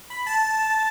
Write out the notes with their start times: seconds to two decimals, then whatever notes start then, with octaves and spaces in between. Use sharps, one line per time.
0.10 B5
0.27 A5